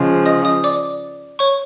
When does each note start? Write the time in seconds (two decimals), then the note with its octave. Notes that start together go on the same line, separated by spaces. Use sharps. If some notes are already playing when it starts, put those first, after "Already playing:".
Already playing: C#3 F3 G#3
0.26 D#5 D#6
0.45 D#5 D#6
0.64 D5 D6
1.39 C#5 C#6